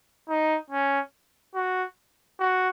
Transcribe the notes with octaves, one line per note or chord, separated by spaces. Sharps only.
D#4
C#4
F#4
F#4